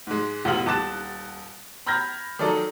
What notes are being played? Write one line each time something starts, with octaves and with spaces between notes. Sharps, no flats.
G#2 G#3
E1 A1 F4 F5 F#7
D#1 A5 D6 F#6 A6 E7
A#5 B5 F6 G6 G#6 A#6
D#3 F#3 D#4 A4 D5